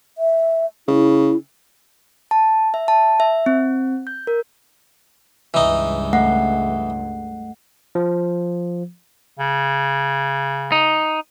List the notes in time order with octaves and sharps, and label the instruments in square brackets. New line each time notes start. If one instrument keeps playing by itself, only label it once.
[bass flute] E5
[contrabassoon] C#3 [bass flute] E4
[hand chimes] A5
E5
A5
E5
C4
G6
A#4
[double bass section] C#2 G2 [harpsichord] E3 D#4
[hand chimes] A3 F#5
[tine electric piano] F3
[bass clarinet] C#3
[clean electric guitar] D#4